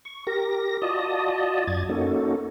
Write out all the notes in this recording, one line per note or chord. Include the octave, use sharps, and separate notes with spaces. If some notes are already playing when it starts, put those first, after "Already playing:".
C#6
G4 A#4 A#6
F4 F#4 D5 D#5 A5 D#6
F#2 D5 G#6 A6
A#3 C#4 D#4 F#4 A4